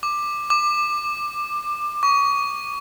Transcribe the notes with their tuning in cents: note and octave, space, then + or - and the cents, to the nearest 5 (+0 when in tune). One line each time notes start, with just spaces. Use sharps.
D6 +15
D6 +25
C#6 +30